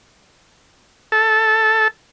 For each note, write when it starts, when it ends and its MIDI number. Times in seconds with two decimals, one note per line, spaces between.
1.12 1.88 69